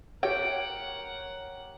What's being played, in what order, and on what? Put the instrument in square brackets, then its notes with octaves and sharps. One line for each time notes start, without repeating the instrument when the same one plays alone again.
[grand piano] G4 C#5 [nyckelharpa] A#4 F#5 [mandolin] G5